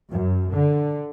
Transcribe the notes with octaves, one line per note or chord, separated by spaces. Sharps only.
F#2
D3